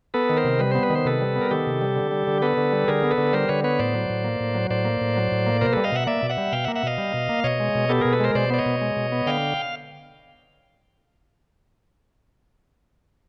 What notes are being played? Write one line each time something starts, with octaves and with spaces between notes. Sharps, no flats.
B3 A4 B4
D#3
A#4 C5
C3
G3 B4
B3 C5
B4
D#3
C5
C3 A4 B4
G3
B3
A#4
D#3 G4 A4
C3
G3
D3
G3
D3
B3 A4 B4
D3
G3
D3 G#4 A#4
B3
A4 B4
D3
G3 A#4 C5
D3 B4 C#5
B3 B4 C#5
A2 C5 D5
F#3
A2
A#3
A2
F#3
A2 C5 D5
A#3
A2
F#3
A2
A#3
B2 A#4 C5
G3 A4 B4
D#5 F5
B2 E5 F#5
A#3 D5 E5
B2
E5 F#5
G3
B2 F5 G5
E5 F#5
A#3
E5 F#5
B2 D#5 F5
G3
B2
A#3
B2 C#5 D#5
G#3
B2
B3 G4 A4
B2 G#4 A#4
A4 B4
G#3 A#4 C5
B2 C5 D5
B3 D5
C#5 D#5
B2
G#3
B2
B3
D3 F5 G5